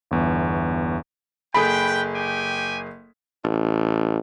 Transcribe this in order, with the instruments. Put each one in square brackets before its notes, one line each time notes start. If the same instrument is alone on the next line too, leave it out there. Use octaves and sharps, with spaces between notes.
[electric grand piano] G1 E2
[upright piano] F#1 G#4 B6 [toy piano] A4 B5 [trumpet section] B4 G5
[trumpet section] G4 G5 G#5
[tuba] A1